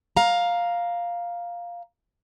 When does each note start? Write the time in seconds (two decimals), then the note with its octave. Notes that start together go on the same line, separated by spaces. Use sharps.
0.17 F5 A#5